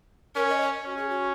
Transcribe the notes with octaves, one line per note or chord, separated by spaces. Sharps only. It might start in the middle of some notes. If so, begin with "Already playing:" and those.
C#4 A#4
D#5
C#5
C#4 F#4
G#4
F#4